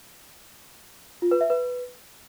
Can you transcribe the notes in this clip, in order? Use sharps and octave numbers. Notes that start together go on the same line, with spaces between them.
F4
B4
E5
B4